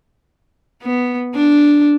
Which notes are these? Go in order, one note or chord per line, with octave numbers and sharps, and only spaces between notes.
B3
D4